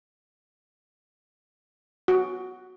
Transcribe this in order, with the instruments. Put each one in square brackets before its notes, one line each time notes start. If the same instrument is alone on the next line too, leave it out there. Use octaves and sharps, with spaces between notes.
[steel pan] F#4